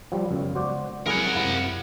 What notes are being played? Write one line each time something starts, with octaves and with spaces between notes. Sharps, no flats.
F3 G3
F#2 C#3 G#3 B3
F#4 C5 D5
F#3 G#3 C4 E4 G#4 A#4 F#5
F#2 C3 E4 F5